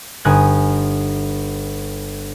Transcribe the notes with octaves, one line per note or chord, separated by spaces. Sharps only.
G1 D#4 G#5 F#6